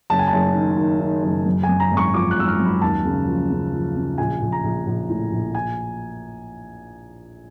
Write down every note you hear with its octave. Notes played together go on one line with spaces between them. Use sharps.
F#1 A5
G#5
F#1 A5
D#3
D#3
D#3
F#1
F#2
G#5
F#2
A#5
G#1
C#6
F3 D6
F#6
G#1 E6
F6
F#2
B5
D#2 A5
C#3
F3
C#3
F3
C#3
A#1 G#5
A#1
A#5
A#1
A#1
A2
A#1
G#5